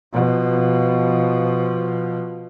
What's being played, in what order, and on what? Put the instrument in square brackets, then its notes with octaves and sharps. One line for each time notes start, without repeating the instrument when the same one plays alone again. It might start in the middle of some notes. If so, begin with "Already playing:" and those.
[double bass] B2 F3